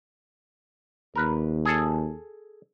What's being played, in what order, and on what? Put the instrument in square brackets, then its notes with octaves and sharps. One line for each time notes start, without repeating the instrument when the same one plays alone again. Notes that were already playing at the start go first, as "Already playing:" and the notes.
[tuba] D#2 [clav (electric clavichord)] A#4 B4
[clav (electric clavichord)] G#4 A4